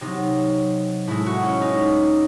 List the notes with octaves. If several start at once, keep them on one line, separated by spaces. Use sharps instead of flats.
C3 F#3 D#4
A2 G#3 E4
F#4
C#4
D#4